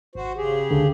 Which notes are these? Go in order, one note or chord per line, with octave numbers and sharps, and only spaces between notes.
G#1 F#4 C5
C#3 G4 G#4
C#2 D3